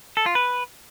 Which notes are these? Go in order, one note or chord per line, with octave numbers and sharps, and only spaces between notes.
A4
F4
B4